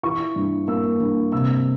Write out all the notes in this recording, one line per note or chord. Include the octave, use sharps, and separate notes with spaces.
E3 C#6
G2
A#3 E6
G2
C3 E6